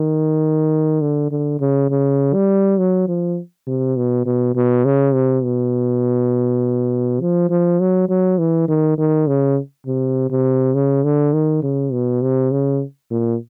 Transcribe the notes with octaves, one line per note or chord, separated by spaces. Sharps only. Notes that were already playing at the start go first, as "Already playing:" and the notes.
Already playing: D#3
D3
D3
C#3
C#3
G3
F#3
F3
C3
B2
B2
B2
C#3
C3
B2
F3
F3
F#3
F#3
E3
D#3
D#3
C#3
C3
C3
C#3
D3
D#3
C#3
B2
C3
C#3
A#2